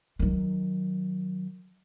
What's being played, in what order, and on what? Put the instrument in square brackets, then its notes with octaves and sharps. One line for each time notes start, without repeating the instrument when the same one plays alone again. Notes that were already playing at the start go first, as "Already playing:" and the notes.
[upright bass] D#3 F#3